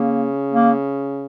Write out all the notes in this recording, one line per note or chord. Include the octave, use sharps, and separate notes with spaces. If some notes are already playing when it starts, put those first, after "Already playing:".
Already playing: C#3 A#3
A#3